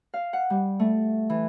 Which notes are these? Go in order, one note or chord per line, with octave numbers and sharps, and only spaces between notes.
F5
F#5
G3
A3
E3